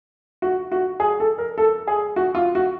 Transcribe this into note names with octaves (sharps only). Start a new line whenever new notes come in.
F#4
F#4
G#4
A4
A#4
A4
G#4
F#4
F4
F#4